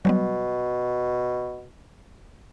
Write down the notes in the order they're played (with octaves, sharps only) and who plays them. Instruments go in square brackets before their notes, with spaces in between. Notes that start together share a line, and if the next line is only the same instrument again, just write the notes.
[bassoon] B2 [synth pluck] F#3 G3 B3